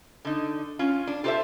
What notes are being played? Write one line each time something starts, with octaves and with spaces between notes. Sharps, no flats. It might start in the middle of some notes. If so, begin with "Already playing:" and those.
D3 D#4
C#4 F4
D4
F4 G4 A4 B4 C5 E5